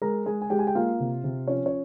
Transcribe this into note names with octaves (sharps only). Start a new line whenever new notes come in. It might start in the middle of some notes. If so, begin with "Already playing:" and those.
G#3 A#4 A#5
G#3 G#4 G#5
G#5
G#3 G4 G5
G#5
G5
A#3 F4 F5
C3
C3
F3 C#4 C#5
C#4 C#5